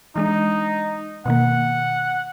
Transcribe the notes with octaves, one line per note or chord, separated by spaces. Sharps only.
E3 G#3 D4 D#4
B2 D#3 A#3 F#5